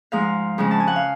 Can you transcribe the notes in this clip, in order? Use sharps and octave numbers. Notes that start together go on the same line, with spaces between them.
G#2 F3 G#3 F5
F2 C#3 G#3
A5
G#5
F#5
F5